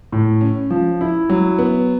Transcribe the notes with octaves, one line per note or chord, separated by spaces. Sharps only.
A2
C#4
F3
E4
F#3
B3